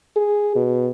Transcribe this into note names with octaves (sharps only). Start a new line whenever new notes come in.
G#4
B2